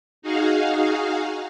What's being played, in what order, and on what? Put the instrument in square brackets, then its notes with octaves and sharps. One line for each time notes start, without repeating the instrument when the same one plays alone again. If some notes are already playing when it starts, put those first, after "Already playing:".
[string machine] D#4 F#4 G#4 F5